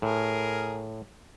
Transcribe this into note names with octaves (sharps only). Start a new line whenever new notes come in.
A2 G#4 A#4